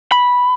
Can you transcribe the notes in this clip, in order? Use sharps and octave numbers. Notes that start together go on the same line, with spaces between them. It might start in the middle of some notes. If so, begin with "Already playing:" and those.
B5